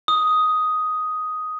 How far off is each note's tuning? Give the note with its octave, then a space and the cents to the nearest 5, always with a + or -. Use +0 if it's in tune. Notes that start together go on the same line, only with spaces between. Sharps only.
D#6 +5